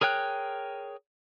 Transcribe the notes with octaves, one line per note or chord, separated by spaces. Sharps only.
G#4 A#4 C#5 G5 F#6